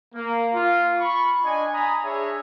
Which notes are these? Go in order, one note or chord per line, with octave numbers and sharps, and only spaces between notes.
A#3
F4
B5 C#6
D4 D#5 G#5
G#5 A#5 B5 D#6
D4 G#4 C#5 E5